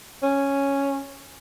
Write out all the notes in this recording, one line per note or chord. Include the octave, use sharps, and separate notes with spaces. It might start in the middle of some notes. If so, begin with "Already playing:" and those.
C#4